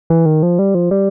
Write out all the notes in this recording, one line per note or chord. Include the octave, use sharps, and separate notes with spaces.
E3
D#3
F3
G3
F3
G3